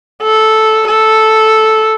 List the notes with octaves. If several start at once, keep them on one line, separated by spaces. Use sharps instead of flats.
A4
A4